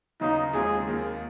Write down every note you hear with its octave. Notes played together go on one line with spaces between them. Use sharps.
D#2 C#3 F#3 B3 D#4 F4
F1 D#2 C#3 F3 G#3 G#4
D#2 D#3 A#3